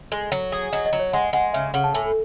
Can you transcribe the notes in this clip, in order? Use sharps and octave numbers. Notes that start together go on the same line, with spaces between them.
G#3
F#3
G#4
F#3 D#5
D#5
F#3
C#5
G#3 F#5
G#3 F#5
C#3 E5
C#3 F#5
A5
A2 G#5